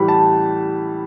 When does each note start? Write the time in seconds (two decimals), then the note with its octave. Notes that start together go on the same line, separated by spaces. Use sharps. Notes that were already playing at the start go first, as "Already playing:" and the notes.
Already playing: A2 E3 G3 B5
0.08 A5